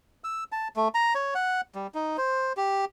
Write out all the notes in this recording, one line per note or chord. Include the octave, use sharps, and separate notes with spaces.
E6
A5
A3
A#5
C#5
F#5
G3
D#4
C5
G4